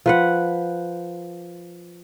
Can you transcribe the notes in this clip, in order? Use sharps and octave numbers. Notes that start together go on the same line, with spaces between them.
F3 B4 F#5